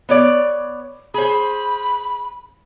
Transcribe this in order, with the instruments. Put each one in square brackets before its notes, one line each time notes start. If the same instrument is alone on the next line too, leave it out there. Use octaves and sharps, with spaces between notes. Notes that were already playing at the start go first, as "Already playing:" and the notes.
[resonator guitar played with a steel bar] B3 C#5 D5
[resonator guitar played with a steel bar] G#4 C5 [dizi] B5